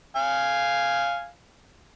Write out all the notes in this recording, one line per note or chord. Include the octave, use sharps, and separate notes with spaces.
F5 G#5